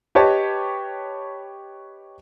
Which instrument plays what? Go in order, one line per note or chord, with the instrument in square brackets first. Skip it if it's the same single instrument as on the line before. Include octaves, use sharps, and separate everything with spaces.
[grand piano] G4 B4 C#5 D#5 A5